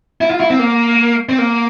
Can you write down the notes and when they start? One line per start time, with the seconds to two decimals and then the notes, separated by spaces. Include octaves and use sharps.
0.21 E4
0.30 F4
0.40 E4
0.50 C4
0.59 A#3
1.29 C4
1.38 A#3